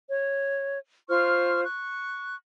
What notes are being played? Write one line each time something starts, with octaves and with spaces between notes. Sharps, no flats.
C#5
F4 C5 C#6 F6
C#6 F#6